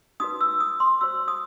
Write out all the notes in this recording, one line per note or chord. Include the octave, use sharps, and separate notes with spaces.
D#4 F#4 B4 D#6
E6
D#6
C6
F#4 C5 E6
D#6